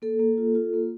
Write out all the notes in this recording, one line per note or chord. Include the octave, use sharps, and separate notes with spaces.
A#3 A4
A#3
F4
F4
A#3